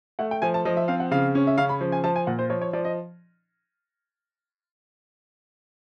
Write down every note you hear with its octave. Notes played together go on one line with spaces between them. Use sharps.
A3 F#5
G5
F3 G#5
A5
F3 D#5
E5
C4 F5
F#5
C#3 F5
C#4
E5
C#3 F5
B5
F3
G#5
F3 A5
G#5
A#2 F#5
C5
F3 C#5
C#5
F3 D5
D#5